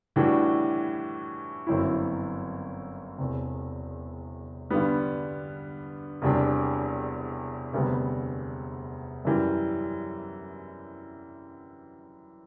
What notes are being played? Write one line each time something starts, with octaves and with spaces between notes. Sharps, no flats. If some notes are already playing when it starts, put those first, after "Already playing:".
A2 E3 G3 D4 F#4
G1 F#2 F#3 C4 E4
E1 E2 C3
G2 D3 G3 B3
E1 E2 C3 G3 D4
E1 D2 C3 G3 B3
F#2 E3 G3